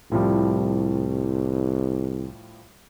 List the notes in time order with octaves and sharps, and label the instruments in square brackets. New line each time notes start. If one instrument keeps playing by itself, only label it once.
[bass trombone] C2 [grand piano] A2 F3 G3